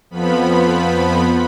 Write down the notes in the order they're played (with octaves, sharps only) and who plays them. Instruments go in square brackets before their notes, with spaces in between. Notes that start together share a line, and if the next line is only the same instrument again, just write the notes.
[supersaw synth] F2 F3 B3 B5